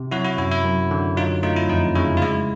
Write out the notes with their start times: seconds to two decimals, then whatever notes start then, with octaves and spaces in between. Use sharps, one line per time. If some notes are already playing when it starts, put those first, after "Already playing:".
Already playing: C3
0.11 F#3 E4 F#4
0.24 E4 F#4
0.38 F#2 E4
0.51 E4
0.64 F#2
0.91 D3
1.17 F#3 D#4 F4
1.43 A3 D#4 F4
1.56 E4
1.69 F2 D#4
1.95 C#3 E4
2.17 F4
2.22 G#3 E4